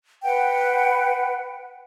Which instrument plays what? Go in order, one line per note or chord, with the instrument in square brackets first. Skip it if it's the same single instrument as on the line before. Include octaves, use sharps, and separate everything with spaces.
[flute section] B4 F#5 G5